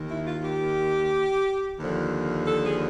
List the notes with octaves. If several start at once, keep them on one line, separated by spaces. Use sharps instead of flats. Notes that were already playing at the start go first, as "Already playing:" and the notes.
Already playing: D#2 D#3
E4
F4
G4
D#2 D3 F3
A4
G#4